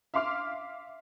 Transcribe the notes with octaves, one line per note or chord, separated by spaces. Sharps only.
E5 F5 C6 D6 F6